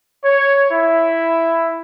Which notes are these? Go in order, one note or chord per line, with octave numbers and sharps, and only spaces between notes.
C#5
E4